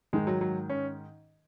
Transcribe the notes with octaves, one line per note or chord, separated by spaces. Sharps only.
G#2 D#3 G#3
F#3
F#3
C#4